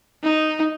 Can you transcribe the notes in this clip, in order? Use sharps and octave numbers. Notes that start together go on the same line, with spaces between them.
D#4